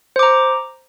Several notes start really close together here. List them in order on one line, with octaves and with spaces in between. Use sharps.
C5 D6 A#5